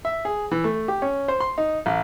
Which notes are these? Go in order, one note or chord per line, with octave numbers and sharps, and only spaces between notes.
E5
G#4
E3
A3
G4
C#4
C5
C6
D#4
A1